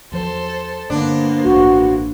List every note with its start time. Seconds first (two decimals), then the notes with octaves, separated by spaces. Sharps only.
0.12 E2 F3 F#3 A4 C5
0.90 G2 D3 G#3 A#3 B3 D4 C5
1.44 A1 G2 G#3 F#4